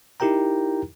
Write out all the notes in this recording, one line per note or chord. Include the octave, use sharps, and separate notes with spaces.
D#4 E4 G4 A#4 G5 A#5